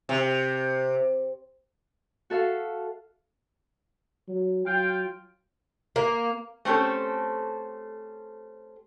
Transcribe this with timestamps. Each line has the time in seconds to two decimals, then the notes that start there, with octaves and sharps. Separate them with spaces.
0.09 C3
2.30 F#4 A4 E5 F5
4.28 F#3
4.67 F#3 F4 G5
5.96 A#3
6.65 A3 C4 C#4 G4 A4